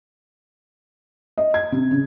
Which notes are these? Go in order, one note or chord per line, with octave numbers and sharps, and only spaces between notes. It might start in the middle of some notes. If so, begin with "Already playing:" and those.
D#5
G#6
C3
C#3